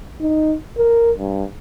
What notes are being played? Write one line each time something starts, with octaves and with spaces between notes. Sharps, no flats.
D#4
A#4
G2